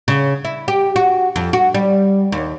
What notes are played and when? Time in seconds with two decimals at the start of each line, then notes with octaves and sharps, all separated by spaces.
0.08 C#3
0.45 E4
0.68 G4
0.96 F#4
1.36 F2
1.53 F#4
1.74 G3
2.32 D#2